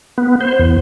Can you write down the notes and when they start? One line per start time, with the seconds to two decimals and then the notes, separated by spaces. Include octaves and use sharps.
0.18 B3
0.41 C5
0.59 E2